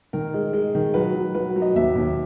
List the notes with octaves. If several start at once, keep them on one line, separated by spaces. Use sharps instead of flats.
D#3 A#4
G#3
G#3
D#3
F#3 B4
F#3
F#3 B4
F#3
D#5
D#2 E5
D#2